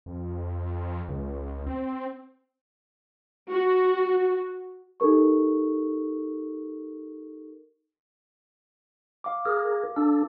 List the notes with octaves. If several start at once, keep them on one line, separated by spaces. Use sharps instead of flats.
F2
C#2
C4
F#4
D#4 G4 A4 A#4 C#6
F5 D6
G#4 A#4
D4 A4